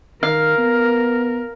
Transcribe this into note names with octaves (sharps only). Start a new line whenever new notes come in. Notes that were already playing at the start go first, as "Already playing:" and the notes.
D#3 A#4 F5
B3